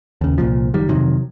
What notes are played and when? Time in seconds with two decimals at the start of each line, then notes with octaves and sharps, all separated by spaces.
0.21 D#2 C#3
0.38 C2 A#2 F3
0.74 F#1 D#3 G3
0.88 F2 C3 D#3 F#3